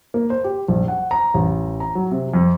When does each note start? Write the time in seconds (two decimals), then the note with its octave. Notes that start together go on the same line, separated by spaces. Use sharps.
0.14 A#3
0.30 C5
0.44 G4
0.68 A#1
0.88 F#5
1.11 A#5
1.34 A1
1.80 A#5
1.95 F#3
2.11 C3
2.34 F2